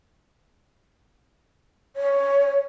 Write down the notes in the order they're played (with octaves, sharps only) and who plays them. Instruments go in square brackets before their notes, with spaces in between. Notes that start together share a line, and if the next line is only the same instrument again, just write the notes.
[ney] C#5